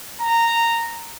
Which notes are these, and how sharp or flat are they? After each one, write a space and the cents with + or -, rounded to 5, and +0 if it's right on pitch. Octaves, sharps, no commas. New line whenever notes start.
A#5 -10